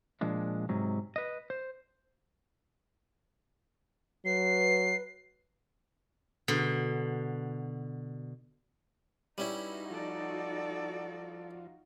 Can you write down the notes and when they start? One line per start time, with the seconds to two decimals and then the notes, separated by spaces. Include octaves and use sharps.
0.21 A#2 F3 G#3 D4
0.69 G#2 C3 F#3
1.16 B4 D#5
1.50 C5
4.25 F#3 B4 C7
6.48 B2 D3
9.38 G3 C#4 D#4 E4 F#4 B4 E5
9.90 F3 F4 A4 D5